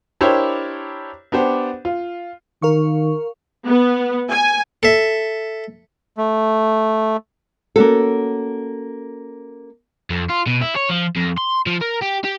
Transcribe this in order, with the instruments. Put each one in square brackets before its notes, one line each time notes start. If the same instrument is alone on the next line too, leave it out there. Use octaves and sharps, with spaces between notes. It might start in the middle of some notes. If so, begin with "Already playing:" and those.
[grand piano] D4 E4 G4 A#4 C5 C#5
B3 D4 G4 C5
F4
[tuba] D#3 [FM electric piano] A#4 F5 C#6
[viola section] B3
G#5
[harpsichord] A4 E5
[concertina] A3
[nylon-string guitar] A#3 C#4 F#4 A4
[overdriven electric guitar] F2
F4
B2
E4
C#5
F3
F2
C6
F3
A#4
G4
G4